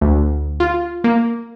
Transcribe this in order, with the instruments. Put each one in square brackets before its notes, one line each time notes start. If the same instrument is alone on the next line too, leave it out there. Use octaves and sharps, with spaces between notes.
[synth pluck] D2
F4
A#3